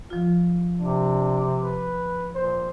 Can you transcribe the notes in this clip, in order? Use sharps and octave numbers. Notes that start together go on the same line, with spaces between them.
F3 F4
C3 D4
B4
A#2 C5